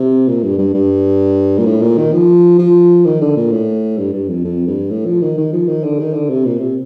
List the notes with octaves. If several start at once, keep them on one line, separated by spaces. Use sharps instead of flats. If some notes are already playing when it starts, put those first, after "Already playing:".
Already playing: C3
A#2
G2
G2
G2
A#2
A2
A#2
D#3
F3
F3
D#3
D3
A#2
A2
G2
G2
F2
F2
G2
A2
F3
D#3
D#3
F3
D#3
D3
D#3
D3
C3
A#2
C3